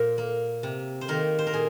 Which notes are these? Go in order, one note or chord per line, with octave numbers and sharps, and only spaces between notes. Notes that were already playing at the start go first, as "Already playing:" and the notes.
Already playing: A#2 A#4 C5
A#3
C3
C5
D#3 A#3 A#4
C5
A#4
A#2 G#4